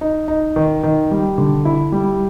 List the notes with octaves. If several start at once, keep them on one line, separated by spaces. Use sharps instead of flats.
D#4
D#4
D#3
D#3
G3
D3
E4
G3